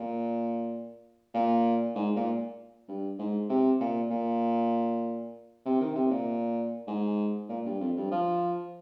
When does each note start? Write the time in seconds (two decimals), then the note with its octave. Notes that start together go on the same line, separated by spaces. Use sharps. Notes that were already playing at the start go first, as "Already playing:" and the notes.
Already playing: A#2
1.34 A#2
1.95 G#2
2.16 A#2
2.88 G2
3.19 G#2
3.50 C3
3.80 A#2
4.11 A#2
5.66 C3
5.81 D#3
5.95 C3
6.11 A#2
6.88 G#2
7.49 A#2
7.66 G2
7.81 F2
7.96 G2
8.11 F3